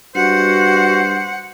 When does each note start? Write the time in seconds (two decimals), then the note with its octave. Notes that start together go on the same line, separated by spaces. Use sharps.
0.15 G2 F#4 C5 F#5